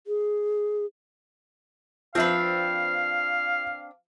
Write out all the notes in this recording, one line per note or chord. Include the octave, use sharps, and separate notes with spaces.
G#4
F3 C4 D4 B4 E5 F5